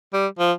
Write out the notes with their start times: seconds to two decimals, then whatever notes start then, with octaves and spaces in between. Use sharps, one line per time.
0.13 G3
0.39 F3